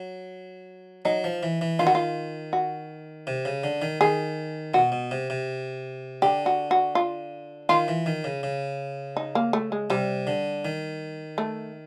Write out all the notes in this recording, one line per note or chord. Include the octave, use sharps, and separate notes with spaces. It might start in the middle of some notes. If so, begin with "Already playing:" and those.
Already playing: F#3
F#3 D#4
F3
E3
E3
D#3 F4
F#4
F4
F#4
C3
C#3
D3
D#3
D#3 G#4
B2 F#4
B2
C3
C3
D3 G4
F#4
F#4
F4
D#3 F4
E3
D#3
C#3
C#3
D#4
A#3
A3
G#3
C3 G3
D3
D#3
A3